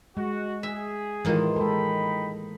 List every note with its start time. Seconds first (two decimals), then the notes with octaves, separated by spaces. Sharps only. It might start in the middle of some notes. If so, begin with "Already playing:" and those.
0.17 G#3 F#4
0.63 G#4 E5
1.25 A2 D#3 E3 G#3 A#3 F4
1.56 G#3 D#4 A4 G5 B5